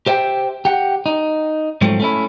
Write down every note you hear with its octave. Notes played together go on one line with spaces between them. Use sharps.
G4 C5 E5 G5
G4 F#5
D#4
G#2 F3 F#3 A3 C4
A3 C#4 E4